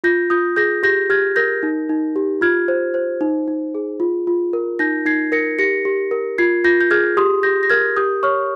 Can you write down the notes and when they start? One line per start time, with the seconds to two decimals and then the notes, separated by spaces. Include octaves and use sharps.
0.04 F4 G6 A#6
0.30 F4 D#6 G6
0.56 G#4 G6 A#6
0.83 G4 G6 A#6
1.09 G4 F6 G#6
1.36 A#4 G6 A#6
1.63 D#4
1.89 D#4
2.16 G4
2.41 F4 F6 G#6
2.68 C5
2.94 C5
3.21 D#4
3.48 D#4
3.75 G#4
4.00 F4
4.27 F4
4.53 A#4
4.79 D#4 G6 A#6
5.05 D#4 G#6 C7
5.32 A#4 A#6 C#7
5.59 G4 A#6 C#7
5.85 G4
6.11 A#4
6.38 F4 G#6 C7
6.64 F4 G6 A#6
6.81 G6
6.91 G#4 F6 G#6
7.17 G4 C6 D#6
7.43 G4 G6 A#6
7.63 A#6
7.70 A#4 F6 G#6
7.97 G4 D#6 G6
8.23 C#5 C#6 F6